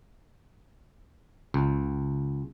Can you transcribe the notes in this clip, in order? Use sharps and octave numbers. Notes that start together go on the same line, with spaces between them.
C#2